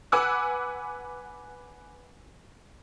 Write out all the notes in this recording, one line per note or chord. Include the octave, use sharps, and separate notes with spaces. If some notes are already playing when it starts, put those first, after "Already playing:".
B4 F#5 G#5 D6 E6 F#6